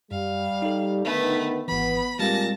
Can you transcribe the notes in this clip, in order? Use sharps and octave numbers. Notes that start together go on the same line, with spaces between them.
F#2 G3 F5
D#4 A4
D3 D#3 A3 B3 B4
G#1 E3 B3 B5
A#2 G3 G#3 A#3 C4 G4 A5 A#6